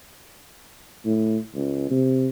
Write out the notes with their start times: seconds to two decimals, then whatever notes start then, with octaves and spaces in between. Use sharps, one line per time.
1.05 A2
1.55 C#2
1.91 C3